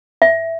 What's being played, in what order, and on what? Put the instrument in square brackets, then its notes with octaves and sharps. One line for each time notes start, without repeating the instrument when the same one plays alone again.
[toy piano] E5